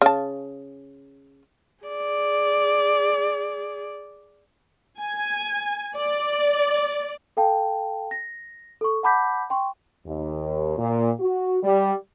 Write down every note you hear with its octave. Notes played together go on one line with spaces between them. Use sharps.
C#3 A5
G#4 D5
G#5
D5
A4 F5 G5 A5
A#6
A4 C#6
F#5 A5 B5 D6 G6 B6
G5 C6 C#6
D#2
A#2
F#4
G3